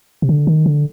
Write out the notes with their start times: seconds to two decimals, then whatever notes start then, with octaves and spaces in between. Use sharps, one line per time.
0.22 C3
0.29 D3
0.47 D#3
0.66 D3